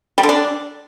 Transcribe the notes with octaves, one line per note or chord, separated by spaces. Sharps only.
G3
D3
D4